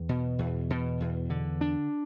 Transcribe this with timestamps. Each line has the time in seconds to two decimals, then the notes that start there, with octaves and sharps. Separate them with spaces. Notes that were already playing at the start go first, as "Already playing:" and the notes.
Already playing: E2
0.09 B2
0.39 E2
0.70 B2
1.00 E2
1.30 D3
1.61 D4